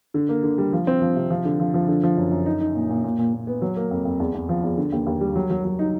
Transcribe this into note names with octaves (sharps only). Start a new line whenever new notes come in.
D3
A#3
D3
G3
F3
C4
F3
C3
F3
D3
F3
F3
D3
F3
F#2
F#2
D#4
D#4
A#2
A#2
A#2
A#2
A#2
B3
F#3
A#3
F2
F2
E2
E2
F3
E2
D3
D#2
D#2
G3
F#3
F#3
F#3
D#4